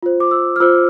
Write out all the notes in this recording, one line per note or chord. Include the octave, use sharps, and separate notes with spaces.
F4 C5
D6
E6
F6
F4 C5 E6